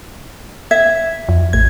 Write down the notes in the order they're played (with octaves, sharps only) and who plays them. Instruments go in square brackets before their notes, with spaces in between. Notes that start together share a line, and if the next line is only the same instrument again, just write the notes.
[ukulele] E5 [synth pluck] G#6
[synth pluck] F2
A1 G#6